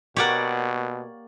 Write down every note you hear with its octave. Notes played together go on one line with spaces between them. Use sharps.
B2 A#3 G4 C#5 D5 F#5